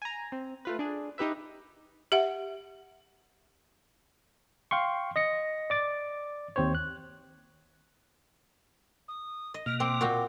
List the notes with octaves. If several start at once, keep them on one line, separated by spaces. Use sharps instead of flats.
G#5 A#5
C4
A3 F4 B4
D4 G#4
D#4 G4 B4 E5
G4 E5 F#5
F5 G5 C6 C#6
D#5 A#6 C#7
D5 D6 A6
D#2 C4 C5 C#5
F#6
D#6
D#5
B2 A#3 F6
C4 D6
A#2 F#4 G5